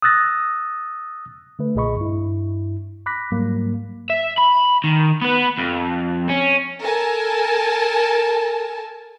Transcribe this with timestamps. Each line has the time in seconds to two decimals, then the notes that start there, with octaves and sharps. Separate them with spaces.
0.02 D#6 E6 F#6 A6 A#6
1.59 D3 A3 B4
1.75 B1 A#2 G#4 D#5 B5 C#6
1.97 G2 E4
3.06 B5 D6 F#6 A#6 B6
3.32 G#2 F#3 G3 A#3
4.10 E5
4.38 B5
4.84 D#3
5.22 B3 B4
5.59 F2
6.29 C#4
6.80 A4 A#4 G#5 A5